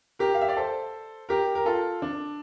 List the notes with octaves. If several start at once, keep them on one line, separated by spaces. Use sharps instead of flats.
G4 A#4
F5
E5
D5
A4 C5
G4 A#4
A#4
F4 A4
D4